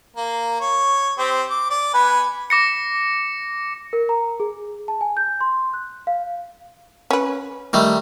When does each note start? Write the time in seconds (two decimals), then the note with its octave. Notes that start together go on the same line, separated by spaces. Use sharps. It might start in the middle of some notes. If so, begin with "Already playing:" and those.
0.16 A#3
0.61 C#5
1.18 C4 G4
1.50 D6
1.70 D5
1.94 B3 B4 G#5
2.50 D6 A#6 C#7
3.93 A#4
4.09 A#5
4.40 G#4
4.88 A5
5.01 G#5
5.17 G6
5.41 C6
5.74 F#6
6.07 F5
7.11 C#4 B4
7.73 D#3 G3 A3